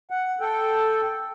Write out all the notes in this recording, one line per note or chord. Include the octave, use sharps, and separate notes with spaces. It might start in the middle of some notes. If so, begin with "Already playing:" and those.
F#5
A4 G5